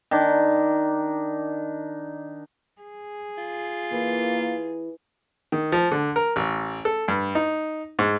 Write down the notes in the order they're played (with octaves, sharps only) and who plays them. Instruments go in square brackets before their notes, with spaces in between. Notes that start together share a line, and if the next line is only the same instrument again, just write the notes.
[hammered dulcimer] D#3 D4
[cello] G#4
[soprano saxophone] F4
[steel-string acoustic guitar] E3 [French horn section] A#3
[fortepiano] D#3
F3
D3
A#4
A1
A4
G2
D#4
G#2